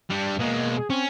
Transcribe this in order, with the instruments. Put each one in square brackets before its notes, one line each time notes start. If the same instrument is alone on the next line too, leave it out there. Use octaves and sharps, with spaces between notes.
[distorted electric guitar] G3 D4
[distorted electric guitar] B2 G#3 [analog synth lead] A#3
[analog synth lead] G#4
[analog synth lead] C4 [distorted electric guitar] C#4